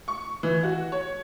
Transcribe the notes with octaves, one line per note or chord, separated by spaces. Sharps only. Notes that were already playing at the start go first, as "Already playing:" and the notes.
C#6
E3
F#4
C#5